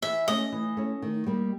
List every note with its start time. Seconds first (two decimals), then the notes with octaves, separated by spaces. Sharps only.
0.02 E3 E5
0.28 A3 C#4 D#5
0.52 E3
0.77 A3 C#4
1.02 D#3
1.26 G3 A#3